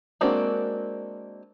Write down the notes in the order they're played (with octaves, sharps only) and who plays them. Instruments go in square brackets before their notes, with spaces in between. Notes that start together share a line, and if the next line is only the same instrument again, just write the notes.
[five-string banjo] G#3 A#3 C4 D4 F#4